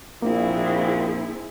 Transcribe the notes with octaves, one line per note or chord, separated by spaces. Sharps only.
A#1 A#3 C4 D#4 E4 G#4